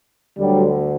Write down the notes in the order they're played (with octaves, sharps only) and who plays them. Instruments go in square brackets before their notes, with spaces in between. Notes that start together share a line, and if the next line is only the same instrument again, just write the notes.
[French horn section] D2 D3 F#3 G3